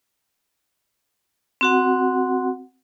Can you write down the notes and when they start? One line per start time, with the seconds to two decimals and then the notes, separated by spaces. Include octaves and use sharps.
1.61 C4 F#4 F#5